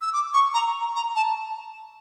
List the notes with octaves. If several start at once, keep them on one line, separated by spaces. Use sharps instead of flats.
E6
D6
C#6
A#5
A#5
A5